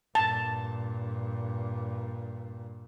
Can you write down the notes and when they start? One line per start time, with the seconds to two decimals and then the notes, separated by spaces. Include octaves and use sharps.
0.15 G2 A#2 A5